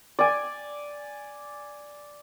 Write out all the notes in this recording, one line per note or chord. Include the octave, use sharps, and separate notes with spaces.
D5 G#5